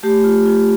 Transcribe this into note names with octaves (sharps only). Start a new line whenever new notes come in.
A3 G4
F4
F4